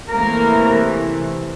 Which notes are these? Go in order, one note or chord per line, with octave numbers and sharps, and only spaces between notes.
C3 E3 A3 A#3 A#4